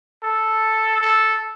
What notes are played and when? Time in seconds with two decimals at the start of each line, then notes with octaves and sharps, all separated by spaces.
0.23 A4
1.01 A4